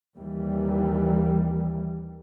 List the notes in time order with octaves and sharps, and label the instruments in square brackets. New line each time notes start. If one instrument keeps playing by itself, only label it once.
[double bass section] D#2 E3 G3